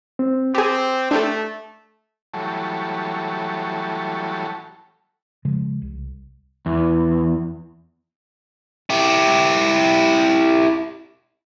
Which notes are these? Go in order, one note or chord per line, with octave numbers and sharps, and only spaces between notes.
C4
C4 G4 G#4 D6
A3 D4 G4 A4
E3 F#3 G3 A3 A4 C#5
C#3 F3 G#3
C2
E2
E4 G4